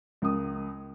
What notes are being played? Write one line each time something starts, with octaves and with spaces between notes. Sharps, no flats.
C#2 A#4 D#6